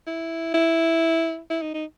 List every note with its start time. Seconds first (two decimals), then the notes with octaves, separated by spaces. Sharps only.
0.07 E4
0.54 E4
1.50 E4
1.62 D#4
1.74 D#4